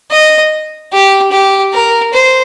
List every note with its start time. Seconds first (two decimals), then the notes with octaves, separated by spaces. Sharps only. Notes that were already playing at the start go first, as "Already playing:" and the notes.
0.11 D#5
0.93 G4
1.32 G4
1.73 A#4
2.13 C5